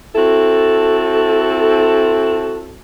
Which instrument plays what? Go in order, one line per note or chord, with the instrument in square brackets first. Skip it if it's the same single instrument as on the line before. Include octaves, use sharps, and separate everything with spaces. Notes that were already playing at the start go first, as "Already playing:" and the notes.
[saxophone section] C4 E4 F#4 A4